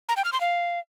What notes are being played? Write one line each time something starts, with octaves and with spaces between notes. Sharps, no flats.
A#5
G5
F6
C6
F5